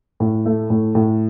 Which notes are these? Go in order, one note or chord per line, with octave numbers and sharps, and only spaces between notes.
A2
A3
A2
A2